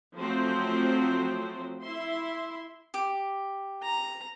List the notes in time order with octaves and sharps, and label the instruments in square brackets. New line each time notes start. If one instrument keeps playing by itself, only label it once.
[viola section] F3 F#3 A3 C4 C5
E4 E5 C6
[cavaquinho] G4 D6
[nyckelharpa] A#5